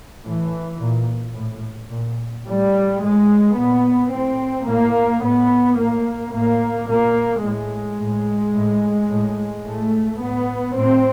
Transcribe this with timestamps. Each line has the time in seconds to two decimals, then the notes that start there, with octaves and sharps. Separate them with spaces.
0.24 A2 E3
0.80 A#2
1.35 A2
1.90 A#2
2.45 A2 G3
3.01 A2 G#3
3.56 A#2 B3
4.11 A2 C4
4.66 A2 A#3
5.22 A2 B3
5.77 A2 A#3
6.32 A2 A#3
6.87 A#2 A#3
7.43 A2 G#3
7.99 A2
8.54 A2
9.10 A2
9.64 A2 A3
10.20 A2 B3
10.75 A2 C4